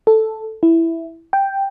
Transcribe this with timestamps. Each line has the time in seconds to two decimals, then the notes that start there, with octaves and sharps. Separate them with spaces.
0.07 A4
0.63 E4
1.33 G5